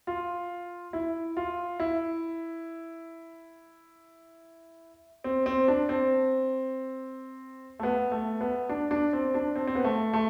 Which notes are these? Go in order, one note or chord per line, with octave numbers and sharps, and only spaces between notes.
F4
E4
F4
E4
C4
C4
D4
C4
A3
B3
A3
B3
D4
D4
C4
D4
C4
C4
B3
A3
A3